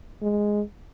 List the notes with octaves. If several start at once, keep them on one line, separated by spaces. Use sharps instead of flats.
G#3